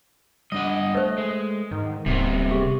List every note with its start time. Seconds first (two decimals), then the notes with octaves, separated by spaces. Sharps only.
0.52 G3 D4 D#5 F#5
0.95 A3 B4 C5
1.18 G#3
1.71 G#2 D#3
2.06 D1 C3 G3 A#3 B3
2.51 G4 G#4